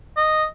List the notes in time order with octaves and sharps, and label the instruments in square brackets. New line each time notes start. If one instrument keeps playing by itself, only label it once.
[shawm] D#5